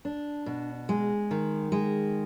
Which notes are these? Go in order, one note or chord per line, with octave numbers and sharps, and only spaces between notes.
D4
B2
G#3
D#3
G#3